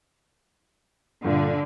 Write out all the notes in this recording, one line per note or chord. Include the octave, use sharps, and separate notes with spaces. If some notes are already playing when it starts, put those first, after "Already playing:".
G2 A#2 D3